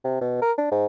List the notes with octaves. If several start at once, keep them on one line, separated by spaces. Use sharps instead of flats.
C3
B2
A#4
D4
G#2